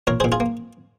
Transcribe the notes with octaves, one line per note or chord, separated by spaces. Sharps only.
A#2 A#4 C#5
A#2 G#4 C5
F4 G#4
A#3